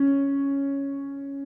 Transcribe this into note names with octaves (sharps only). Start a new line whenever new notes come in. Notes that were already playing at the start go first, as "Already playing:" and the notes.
Already playing: C#4